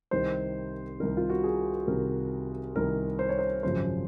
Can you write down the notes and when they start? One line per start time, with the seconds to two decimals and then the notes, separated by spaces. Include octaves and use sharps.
0.11 C2 C3 D#3 C5
1.00 C2 C3 D#3 A#4
1.17 F4
1.30 F#4
1.44 G#4
1.87 C2 C3 D#3 A#4
2.76 C2 C3 D#3 A#4
3.19 C5
3.29 C#5
3.39 C5
3.63 G#1 F#2 C#3 F3 C5